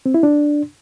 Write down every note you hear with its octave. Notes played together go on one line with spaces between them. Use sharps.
C4
E4
D4